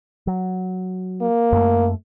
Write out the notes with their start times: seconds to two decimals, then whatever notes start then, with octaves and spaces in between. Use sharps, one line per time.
0.27 F#3
1.21 A#3
1.52 F#2 A3